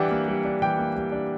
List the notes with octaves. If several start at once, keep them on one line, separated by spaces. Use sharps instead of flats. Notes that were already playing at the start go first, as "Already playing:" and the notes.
Already playing: E3 G3 D4 G4 F#5 G5
A#3
G3
D4
E3 G4 G5
A#3
G3
D4